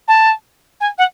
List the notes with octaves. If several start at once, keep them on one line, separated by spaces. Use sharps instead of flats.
A5
G#5
F#5